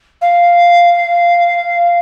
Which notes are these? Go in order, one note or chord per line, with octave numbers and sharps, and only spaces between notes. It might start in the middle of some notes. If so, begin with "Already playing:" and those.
F5